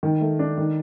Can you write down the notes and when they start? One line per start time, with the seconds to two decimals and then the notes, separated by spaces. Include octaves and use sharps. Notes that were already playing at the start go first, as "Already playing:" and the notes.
0.03 D#3
0.21 A3
0.39 D4
0.58 D#3